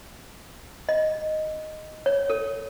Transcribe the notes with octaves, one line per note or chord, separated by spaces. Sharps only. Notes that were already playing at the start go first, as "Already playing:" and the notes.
D#5
C#5
A4